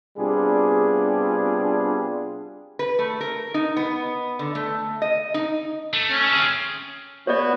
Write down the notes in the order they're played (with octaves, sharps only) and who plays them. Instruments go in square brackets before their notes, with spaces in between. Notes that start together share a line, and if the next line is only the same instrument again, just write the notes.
[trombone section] C3 G3 B3 D4 F4 G#4
[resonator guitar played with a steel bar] B4
A3
A#4
D#4
B3
D3
A3
D#5
D#4
[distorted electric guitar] A3
[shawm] C#4
[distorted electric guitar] C4 G#4
[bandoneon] B3 F#4 [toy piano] C#5 D5